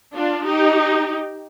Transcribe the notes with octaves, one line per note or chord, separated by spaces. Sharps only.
D4 F4
D#4 G4